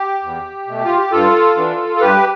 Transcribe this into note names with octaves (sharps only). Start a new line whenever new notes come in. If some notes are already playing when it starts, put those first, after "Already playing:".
Already playing: G4
E2
B2 A3
F4
G4
G2 F4 A4
E3 B3 D4
A4
G2 G4 B4